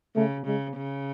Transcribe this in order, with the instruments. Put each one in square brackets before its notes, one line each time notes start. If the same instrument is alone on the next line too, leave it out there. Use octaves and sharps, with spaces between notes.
[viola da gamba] C#3 [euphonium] A3
[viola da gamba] C#3 [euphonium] G#3
[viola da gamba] C#3